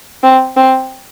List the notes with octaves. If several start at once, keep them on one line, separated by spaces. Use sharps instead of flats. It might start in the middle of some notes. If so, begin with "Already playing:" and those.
C4
C4